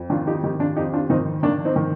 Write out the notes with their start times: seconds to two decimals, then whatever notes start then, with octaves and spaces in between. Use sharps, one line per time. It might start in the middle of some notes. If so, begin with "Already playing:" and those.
Already playing: F2
0.10 D#3 D4 F4
0.27 D#4 G4
0.43 D#3 D#4 G4
0.60 D4 F4
0.76 F2 D#4 G4
0.93 D4 F4
1.10 D#3 C4 D#4
1.43 D#3 A#3 D4
1.65 C4 D#4
1.76 D#3